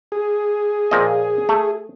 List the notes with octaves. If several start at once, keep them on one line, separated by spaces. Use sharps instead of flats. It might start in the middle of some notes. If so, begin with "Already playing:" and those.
G#4
A#2 F3 D#5
A3